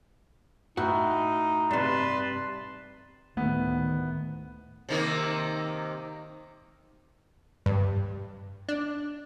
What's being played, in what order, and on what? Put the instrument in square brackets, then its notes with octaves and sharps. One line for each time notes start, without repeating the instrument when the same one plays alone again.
[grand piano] A2 [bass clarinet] D#4 [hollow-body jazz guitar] F#4
[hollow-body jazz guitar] G2 C3 [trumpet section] B4 A5 C6
[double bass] D2 A2 [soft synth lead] D#3 [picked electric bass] A3 [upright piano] B3
[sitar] C3 D#3 A#3
[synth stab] G2
D4